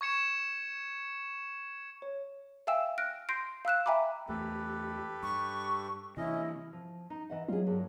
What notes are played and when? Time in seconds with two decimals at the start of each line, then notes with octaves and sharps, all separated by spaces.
0.01 C#6 G#6 C#7 E7
2.02 C#5
2.67 E5 F5 G5 G#5 E6 E7
2.98 F6 F#6 A#6 D7
3.29 C6 G6 A#6 C7 D7
3.65 F5 E6 F#6 E7
3.86 E5 G5 G#5 A#5 B5 D6
4.29 E2 A3 G4 A4 B4
5.23 G2 C#6
6.17 C3 E3 C#4 E4 D#5
6.73 F3
7.10 D#4
7.30 E3 D#5 F#5
7.48 F#3 F4 G#4
7.67 G2 A#3